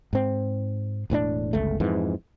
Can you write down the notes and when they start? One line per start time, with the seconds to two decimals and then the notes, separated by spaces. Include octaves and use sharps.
0.13 G#2 C4
1.10 E1 A2 B3 D4
1.53 G1 C#2 A3
1.80 F2 G#2 E3